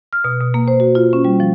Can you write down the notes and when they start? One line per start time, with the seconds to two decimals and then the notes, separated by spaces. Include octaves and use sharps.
0.13 F6
0.24 B2
0.41 B2
0.54 A#3
0.68 C5
0.80 F#4
0.95 F4
1.13 C#4
1.25 G3
1.40 F3